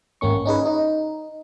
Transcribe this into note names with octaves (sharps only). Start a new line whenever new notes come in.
G#1 A#3 C#4 C#6
C#4 D#4 G#4 B4
D#4